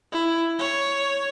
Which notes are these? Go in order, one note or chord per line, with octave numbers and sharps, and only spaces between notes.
E4
C#5